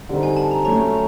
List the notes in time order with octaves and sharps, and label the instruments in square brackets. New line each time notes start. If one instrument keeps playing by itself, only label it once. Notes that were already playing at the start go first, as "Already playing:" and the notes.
[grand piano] D3 G3 C4 D#4
[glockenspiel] G#5
A5
A#5
[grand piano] F#3 A3 C#4 [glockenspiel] A#5